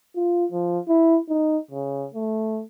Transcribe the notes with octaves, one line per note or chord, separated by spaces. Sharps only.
F4
F3
E4
D#4
C#3
A3